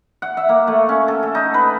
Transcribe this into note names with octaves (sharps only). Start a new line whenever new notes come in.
F#5
E5
A#3
A3
C#4
A4
A4
D#4
B4